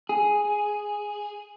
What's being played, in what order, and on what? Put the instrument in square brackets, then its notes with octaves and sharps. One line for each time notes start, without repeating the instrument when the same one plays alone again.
[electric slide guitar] G#4